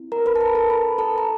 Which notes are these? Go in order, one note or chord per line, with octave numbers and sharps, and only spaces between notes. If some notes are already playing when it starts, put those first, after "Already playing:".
Already playing: C4 E4
A#4 A#5
B4 B5
A5
A#4 A#5
A4 A5
B4 B5
A4 A5
A#5